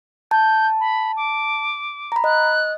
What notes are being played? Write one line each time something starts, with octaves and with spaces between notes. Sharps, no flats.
A5 G6
B5
D6
A#5 B5
D#5 F#6